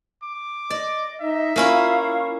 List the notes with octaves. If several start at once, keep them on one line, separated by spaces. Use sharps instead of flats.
D6
D5 D#5
D#4 D#5 E5
A#3 C#4 E4 F4 F5 C#6